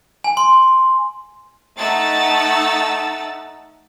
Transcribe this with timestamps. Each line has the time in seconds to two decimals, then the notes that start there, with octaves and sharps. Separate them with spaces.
0.24 G#5
0.37 C6
1.79 A3 D#4 F#5 E6 A6